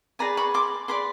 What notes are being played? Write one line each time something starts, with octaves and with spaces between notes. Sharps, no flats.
G#4 B4 D5 G#5 A#5
B5 C#6
C6 D6
G#4 B4 D5 C6 D6